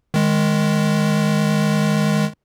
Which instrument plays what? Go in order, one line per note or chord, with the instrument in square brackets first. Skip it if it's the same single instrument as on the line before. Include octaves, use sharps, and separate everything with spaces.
[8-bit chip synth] D#3 G#3